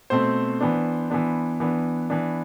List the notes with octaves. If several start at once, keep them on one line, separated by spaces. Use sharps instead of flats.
B2 A3 C4 C5
E3 B3 D4
E3 B3 D4
E3 B3 D4
E3 B3 D4